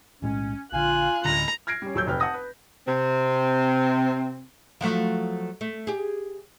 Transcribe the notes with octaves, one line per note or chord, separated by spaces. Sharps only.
B1 A2 G#3 C#4
A#1 D3 F4 F5 G#5 F#6
D2 A2 D3 G#3 C#4 E4 A#5
F6 G#6 A#6 C7 D7
G3 C#4
D#1 F#3 E6 G6
F1 B4 G5 F6
F#5 A5 D#6 A#6
B4
C3 C4
F3 F#3 A3
A3
G4 G#4